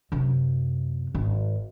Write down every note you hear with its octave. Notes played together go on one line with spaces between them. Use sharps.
F#2 C3
G#1